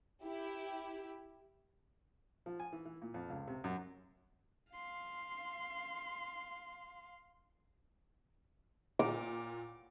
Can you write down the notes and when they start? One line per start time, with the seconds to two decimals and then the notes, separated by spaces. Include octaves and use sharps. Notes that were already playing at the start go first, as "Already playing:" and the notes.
0.24 E4 G4
2.46 F3
2.60 G#5
2.73 E3
2.85 E3
3.02 A#2
3.14 F2
3.30 C#2
3.48 C3
3.64 F#2
4.73 F5 C6
8.99 A#2 D6